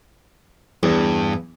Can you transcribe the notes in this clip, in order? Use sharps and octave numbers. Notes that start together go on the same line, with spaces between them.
E2 G2